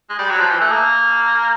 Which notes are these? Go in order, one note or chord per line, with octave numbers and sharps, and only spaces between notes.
G#3
G3
F#3
F3
E3
A3
A#3